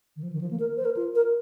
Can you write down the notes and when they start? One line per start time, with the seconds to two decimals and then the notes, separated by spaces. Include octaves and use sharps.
0.16 D#3
0.23 F3
0.33 D#3
0.41 F3
0.51 A#3
0.60 A#4
0.77 C5
0.85 A#4
0.97 F4
1.15 A#4